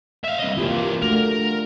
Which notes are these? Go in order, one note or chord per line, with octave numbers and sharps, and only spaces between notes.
E5 F5
C2 D#5
E3 A#3 F4 G4
A3 D4 F#4 A#4